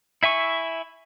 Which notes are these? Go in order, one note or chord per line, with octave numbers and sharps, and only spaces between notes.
E4 E5 G#5 C#6